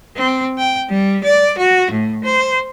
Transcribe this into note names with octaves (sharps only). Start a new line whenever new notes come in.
C4
G5
G3
D5
F#4
A2
C5